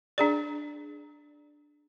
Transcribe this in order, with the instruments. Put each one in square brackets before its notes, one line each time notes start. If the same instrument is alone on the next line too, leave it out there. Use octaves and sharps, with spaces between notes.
[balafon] D4 G#4 D5